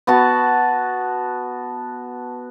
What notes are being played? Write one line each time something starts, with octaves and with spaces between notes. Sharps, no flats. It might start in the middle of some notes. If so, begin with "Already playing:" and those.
B3 F#4 A5